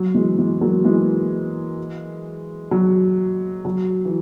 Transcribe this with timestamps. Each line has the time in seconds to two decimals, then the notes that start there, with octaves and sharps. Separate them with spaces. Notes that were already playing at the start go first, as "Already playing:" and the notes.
Already playing: F#3
0.14 E3 G#3
0.39 E3 G#3
0.61 F#3 A#3
0.85 E3 G#3
2.71 F#3
3.65 F#3
4.05 E3